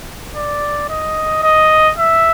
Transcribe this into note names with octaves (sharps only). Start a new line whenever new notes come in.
D5
D#5
D#5
E5